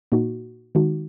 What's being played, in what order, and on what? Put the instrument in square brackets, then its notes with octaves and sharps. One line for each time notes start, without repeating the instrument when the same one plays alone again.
[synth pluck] A#2 A#3 D#4 F#4
D#3 G#3 D#4 F#4